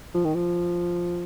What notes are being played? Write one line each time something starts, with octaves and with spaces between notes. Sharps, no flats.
F3
D#3
F3